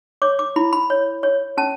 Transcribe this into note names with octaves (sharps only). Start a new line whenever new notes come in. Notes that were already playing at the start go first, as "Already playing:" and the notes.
C#5 D6
D6
E4 B5
B5
C#5
C#5
C#4 A5